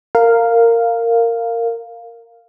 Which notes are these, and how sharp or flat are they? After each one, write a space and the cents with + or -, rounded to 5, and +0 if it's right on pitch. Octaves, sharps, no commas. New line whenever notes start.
A#4 -15 F5 +0